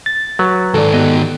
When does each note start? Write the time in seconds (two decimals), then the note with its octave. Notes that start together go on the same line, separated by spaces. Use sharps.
0.06 A6
0.39 F#3 B4
0.74 G#2 D#3 A4 D5
0.93 B3 F#4 G4 D#5